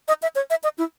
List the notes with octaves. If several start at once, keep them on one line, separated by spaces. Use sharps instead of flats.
D#5
E5
C#5
E5
D#5
E4